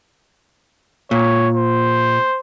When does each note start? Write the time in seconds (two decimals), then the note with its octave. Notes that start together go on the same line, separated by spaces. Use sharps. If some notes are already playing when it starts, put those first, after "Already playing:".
1.11 A#2 C#5
1.55 C5